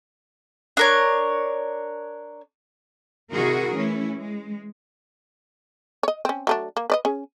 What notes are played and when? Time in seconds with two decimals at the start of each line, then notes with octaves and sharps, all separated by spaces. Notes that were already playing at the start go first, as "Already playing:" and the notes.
0.77 D4 A#4 C#5
3.33 C3 D#3 E4 F#4 G#4 A#4
3.74 E3 A3 C#4 E4
4.16 G#3
6.03 C#5 D#5
6.25 C4 C#4
6.47 F#3 A3 D4
6.77 A#3
6.90 B4 D5 D#5
7.05 C#4 G#4